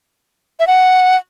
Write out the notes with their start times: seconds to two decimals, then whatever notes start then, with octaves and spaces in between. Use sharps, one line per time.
0.60 E5
0.67 F#5